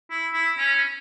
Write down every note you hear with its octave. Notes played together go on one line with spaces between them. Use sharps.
E4
E4
C#4